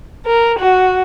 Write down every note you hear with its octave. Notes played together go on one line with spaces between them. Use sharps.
A#4
F#4